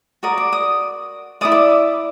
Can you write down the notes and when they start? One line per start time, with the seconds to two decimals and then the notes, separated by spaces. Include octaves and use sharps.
0.23 F#4 A#4 D5 D#6
0.38 D6
0.53 D#6
1.41 E4 A4 D5 D#6
1.52 D6